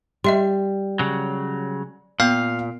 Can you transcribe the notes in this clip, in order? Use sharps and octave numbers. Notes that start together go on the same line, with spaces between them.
G3 D#5 E5 C6
C#3 F#3
A#2 B3 F5